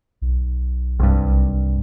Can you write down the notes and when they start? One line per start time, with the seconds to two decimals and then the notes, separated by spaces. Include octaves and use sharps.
0.22 B1
1.00 C2 G2